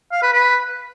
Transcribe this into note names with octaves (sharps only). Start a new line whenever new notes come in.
F5
B4
B4